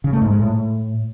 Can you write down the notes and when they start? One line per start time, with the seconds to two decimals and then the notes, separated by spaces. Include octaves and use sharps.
0.04 C#3
0.13 A3
0.22 G#2
0.30 G#3
0.39 A2